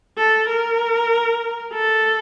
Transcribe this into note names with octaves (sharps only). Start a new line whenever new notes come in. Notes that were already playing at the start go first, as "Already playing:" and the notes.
A4
A#4
A4